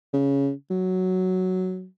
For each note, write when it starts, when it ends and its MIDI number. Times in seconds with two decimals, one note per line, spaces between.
0.13 0.51 49
0.71 1.86 54